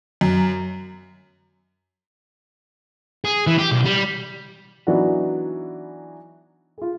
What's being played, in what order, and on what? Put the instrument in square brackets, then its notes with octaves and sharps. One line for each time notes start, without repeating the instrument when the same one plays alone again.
[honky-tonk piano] F#2
[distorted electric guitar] G#4
E3
G4
B1
G3
[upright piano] E3 F#3 B3 D4 D#4 F#4
F4 G#4